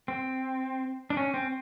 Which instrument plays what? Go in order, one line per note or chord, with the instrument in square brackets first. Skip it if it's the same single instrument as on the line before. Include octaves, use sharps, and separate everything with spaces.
[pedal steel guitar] C4
D4
C#4
C4